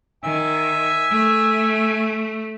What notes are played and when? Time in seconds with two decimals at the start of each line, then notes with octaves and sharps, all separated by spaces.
0.24 D#3 E5 G#5
1.11 A3